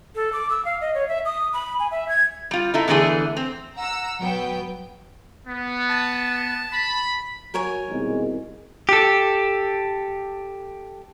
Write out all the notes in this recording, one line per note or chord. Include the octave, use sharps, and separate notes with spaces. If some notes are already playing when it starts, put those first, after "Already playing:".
A4
D6
E6
F5
D#5
C#5
E5
D#6
B5
G#5
E5
G#6
G3 F4
D#4 E4 A4
E2 D3 E3 A3 G#4
C4
F#5 A#5 E6
F#3 B3 G5
B3
A5
B5
F#3 A#4 C#5 G#5
C2 B2 D#3 G#3
G4 A4